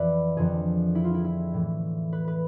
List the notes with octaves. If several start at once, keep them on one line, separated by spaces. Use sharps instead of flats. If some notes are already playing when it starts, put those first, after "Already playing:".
Already playing: F2 E3 B4 D5 E5
F2 D3 F3 G#4
E4
F4
E4
E4
A2 E3
B4
B4